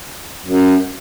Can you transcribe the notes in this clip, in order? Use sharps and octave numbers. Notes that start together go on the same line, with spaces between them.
F#2